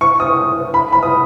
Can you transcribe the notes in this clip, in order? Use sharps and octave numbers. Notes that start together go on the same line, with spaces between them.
C#6
D#6
B5
B5
D#6